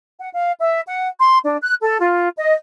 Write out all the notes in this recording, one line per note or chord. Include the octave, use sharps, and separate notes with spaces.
F#5
F5
E5
F#5
C6
D4
F#6
A4
F4
D#5